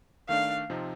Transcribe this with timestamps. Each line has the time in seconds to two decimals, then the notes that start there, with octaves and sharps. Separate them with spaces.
0.28 D#3 A3 D4 F5
0.70 C3 F3 C4 D#4